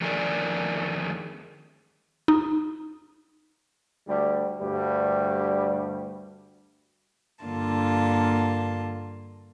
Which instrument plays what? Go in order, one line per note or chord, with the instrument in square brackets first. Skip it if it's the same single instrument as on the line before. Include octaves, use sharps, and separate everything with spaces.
[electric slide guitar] F2 D3 D#3 G#4 A#4 D5
[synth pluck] D#4
[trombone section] D2 G3
D2 G2 G3
[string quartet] G2 D3 A#3 F4 A5